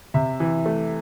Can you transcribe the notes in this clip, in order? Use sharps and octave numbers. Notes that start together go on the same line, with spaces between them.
C3 E5
E3
A3